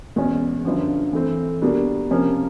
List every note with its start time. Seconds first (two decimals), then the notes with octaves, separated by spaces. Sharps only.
0.16 E2 B2 G#3 C#4
0.65 G1 F#2 D3 F3
1.13 E3 A3 C4
1.62 B2 G3 A#3 D4
2.11 C3 F3 A#3 C#4